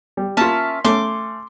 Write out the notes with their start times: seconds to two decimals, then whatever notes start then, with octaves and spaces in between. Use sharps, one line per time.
0.17 G3
0.37 A#3 C#4 F4 E5 A5
0.85 A3 C#4 C6 D6